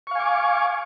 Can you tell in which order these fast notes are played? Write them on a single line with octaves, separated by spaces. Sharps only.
C#6 F5 G#5 D6